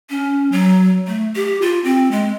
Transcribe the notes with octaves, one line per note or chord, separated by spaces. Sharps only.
C#4
F#3
A3
G4
F4
C4
G#3